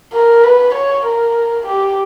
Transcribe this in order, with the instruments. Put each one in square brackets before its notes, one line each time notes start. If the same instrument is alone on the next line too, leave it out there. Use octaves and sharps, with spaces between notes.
[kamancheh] A#4
B4
C#5
A#4
G4